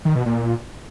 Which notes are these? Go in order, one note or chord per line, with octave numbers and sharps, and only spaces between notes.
D#3
B2
A#2